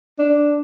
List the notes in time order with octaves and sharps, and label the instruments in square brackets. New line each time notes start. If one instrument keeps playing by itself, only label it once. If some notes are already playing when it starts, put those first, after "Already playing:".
[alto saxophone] D4